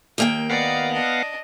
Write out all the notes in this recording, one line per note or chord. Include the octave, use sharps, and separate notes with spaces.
D#2 A#3 G5
B3 D5 D#5 F5 F#5
D4 D#5